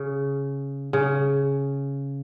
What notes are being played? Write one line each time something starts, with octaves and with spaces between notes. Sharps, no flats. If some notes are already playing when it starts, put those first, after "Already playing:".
Already playing: C#3
C#3